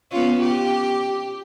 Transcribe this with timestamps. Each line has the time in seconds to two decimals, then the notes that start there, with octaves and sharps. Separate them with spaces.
0.11 B3 C#4 F4
0.42 G4